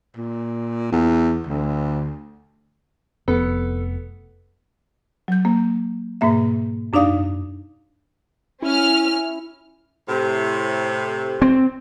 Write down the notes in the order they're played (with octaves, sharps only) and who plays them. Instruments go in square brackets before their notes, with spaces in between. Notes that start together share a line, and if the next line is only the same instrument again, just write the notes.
[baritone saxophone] A#2
E2
D2
[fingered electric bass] F1 [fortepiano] B3 [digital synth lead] A4
[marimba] F#3 G6
A#3
G#2 B2 A#3 E5
F#2 D4 D#4 D5 F5 D#6
[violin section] C#4 F6 [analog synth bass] E4
[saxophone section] A2 C3
[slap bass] C4